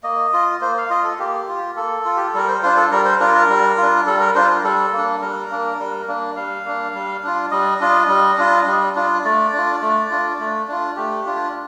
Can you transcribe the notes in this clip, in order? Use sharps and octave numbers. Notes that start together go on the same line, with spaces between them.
A#3 D#5
F4
A#3 C5
F5
F4 D#5
A4
A#3 G4
F4
A#3 A4
F4
G4
A4
G3 A#4
C5
D4 F4 C5
A4
G3 A#4
C5
D4 F4 A#4
A#4
G3
D4 F4
G3 A4
A#4
D4 F4 C5
A#4
G3 A4
A#3 D4
G3 A#4
A#3 D4
G3
A#3 D4
G3 F5
A#3 D4
G3
D4 F4
G3 D#5
D4 F4
G3
D4 F4
G3
D4 F4
A3 D5
D4 F4
A3
D4 F4
A3
D4 F4
A3 G4
D4 F4